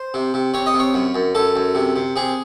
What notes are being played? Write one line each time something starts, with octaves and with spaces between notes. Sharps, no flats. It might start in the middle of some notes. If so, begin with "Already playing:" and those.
Already playing: C5
C3
C3
C3 C#5
D#5
C3
C#5
F#2
F#2
F#2 A4
F#2
C3
C3
C3 G#4